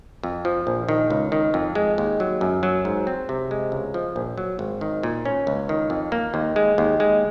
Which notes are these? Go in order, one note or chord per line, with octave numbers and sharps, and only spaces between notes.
F2
F3
A#1
D#3
C#2
D#3
F2
G#3
D#2
F#3
F#2
F#3
G#2
C4
C3
G#3
C#2
F3
A#1
F#3
G#1
D#3
A#2
C#4
C#2
D#3
F2
A#3
D#2
G#3
D#2
G#3